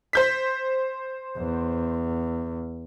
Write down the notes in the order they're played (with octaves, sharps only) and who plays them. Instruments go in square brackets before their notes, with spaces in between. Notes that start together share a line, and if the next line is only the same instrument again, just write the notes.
[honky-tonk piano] C5 G6 B6
[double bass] E2